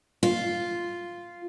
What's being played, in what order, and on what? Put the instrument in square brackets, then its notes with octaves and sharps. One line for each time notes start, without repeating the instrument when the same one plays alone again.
[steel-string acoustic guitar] F4